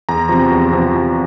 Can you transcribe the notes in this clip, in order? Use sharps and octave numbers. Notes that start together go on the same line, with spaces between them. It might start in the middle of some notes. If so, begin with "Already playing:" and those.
E2 A#5
C3 F3
E2
C3 F3
E2